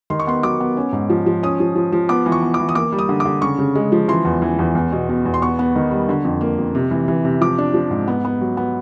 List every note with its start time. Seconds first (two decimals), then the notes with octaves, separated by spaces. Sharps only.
0.10 D#3 C6
0.20 C#6
0.27 B3 C6
0.43 F#3 D6
0.60 B3
0.77 C#4
0.93 G#2
1.10 F3
1.26 F3
1.43 C#4 D#6
1.60 F3
1.76 F3
1.92 F3
2.09 B3 D6
2.26 E3
2.32 C#6
2.42 B3
2.54 D6
2.60 E3
2.69 D#6
2.75 A#3 D6
2.92 G3
2.99 D#6
3.09 D3
3.20 D6
3.25 D3
3.42 C#3 C#6
3.59 C#3
3.75 G#3
3.92 F3
4.08 E3 C6
4.25 E2
4.42 E3
4.59 E2
4.75 E2
4.92 B2
5.09 B2
5.25 E2
5.34 C6
5.42 B3 C#6
5.59 B3
5.76 D#3
5.91 G3
6.09 D3
6.25 F2
6.41 A#3
6.59 F2
6.75 C3
6.91 E3
7.08 E3
7.25 C3
7.41 F3 D6
7.58 D4
7.74 F3
7.91 G#2
8.08 B3
8.25 B3
8.41 F#3
8.57 B3